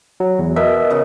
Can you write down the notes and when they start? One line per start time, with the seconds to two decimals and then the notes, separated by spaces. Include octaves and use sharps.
0.20 F#3
0.39 E2
0.56 B2 A#4 E5
0.90 C#3 D#5